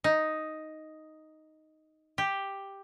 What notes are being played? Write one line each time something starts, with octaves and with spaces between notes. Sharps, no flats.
D#4
G4